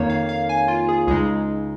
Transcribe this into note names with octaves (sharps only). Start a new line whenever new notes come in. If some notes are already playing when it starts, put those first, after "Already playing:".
Already playing: F2 D#3 A#3 D#4 C#5
F5
F5
G#5
F4
G#4
C#2 C#3 G#3 D#4 G#4